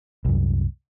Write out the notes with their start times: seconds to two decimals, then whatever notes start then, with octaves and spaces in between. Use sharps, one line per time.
0.25 C2 F#2